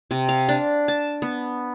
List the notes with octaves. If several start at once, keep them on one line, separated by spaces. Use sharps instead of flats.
C3
F5
D4
A5
B3